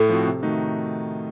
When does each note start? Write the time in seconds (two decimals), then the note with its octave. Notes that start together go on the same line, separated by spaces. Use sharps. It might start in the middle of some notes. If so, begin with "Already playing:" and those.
Already playing: A2 A4
0.10 F3 C4 F#4
0.27 C3
0.43 D#3 A3 D#4 F#4